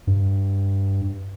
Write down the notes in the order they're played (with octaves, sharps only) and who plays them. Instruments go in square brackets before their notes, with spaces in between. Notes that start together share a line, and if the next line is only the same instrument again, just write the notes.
[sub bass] G2